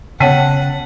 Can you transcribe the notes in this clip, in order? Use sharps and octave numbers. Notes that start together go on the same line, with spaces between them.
C#3 B3 C#5 F#5 G5 A5 B6 D#7